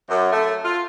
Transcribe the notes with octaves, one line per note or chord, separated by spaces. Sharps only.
F#2
A3
F4